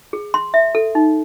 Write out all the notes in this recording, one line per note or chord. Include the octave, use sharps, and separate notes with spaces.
G#4
C6
E5
A4
D#4